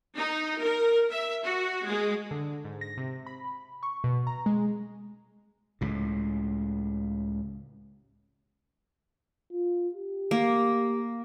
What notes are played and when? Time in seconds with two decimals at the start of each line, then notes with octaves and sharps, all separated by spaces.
0.17 D#4
0.62 A#4
1.11 E5
1.45 F#4
1.86 G#3
2.31 D3
2.64 G#2
2.81 A#6
2.97 C3
3.26 B5
3.83 C#6
4.04 B2
4.27 A#5
4.46 G#3
5.81 C#2 A2
9.52 F4
9.95 G4
10.31 A#3